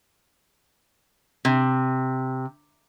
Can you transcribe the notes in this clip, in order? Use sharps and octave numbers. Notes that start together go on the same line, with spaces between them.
C3